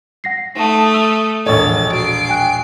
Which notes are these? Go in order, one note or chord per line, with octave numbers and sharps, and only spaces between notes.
F#5 A#6 C7
A3 D#4 A5 D#6
E6 F7
E1 A#1 A4 C#5 D#5 A6
F#4 C7 D7
G5 G#5 F#6